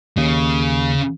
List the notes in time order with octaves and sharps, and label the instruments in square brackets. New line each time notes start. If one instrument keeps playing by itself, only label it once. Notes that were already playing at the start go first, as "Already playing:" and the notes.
[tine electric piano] D#2 [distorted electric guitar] C#3